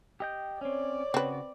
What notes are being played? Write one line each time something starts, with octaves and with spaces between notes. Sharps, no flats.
G4 D#5 G5
C4 C#4 C#5 D5
C#3 C4 F#4 B4